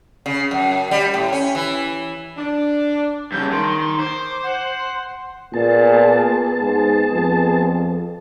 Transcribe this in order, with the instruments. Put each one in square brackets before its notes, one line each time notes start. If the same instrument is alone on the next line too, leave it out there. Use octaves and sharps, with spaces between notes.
[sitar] C#3
F#2
G3
A2
C#4
E3
[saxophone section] D4
[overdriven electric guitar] G2 C#3 [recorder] G6
[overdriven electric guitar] D#3 [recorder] C6
[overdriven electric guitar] C5 [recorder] D6
[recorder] F#5
[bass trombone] A#2 [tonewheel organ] B3 G#4 A5
[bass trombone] G#2
F2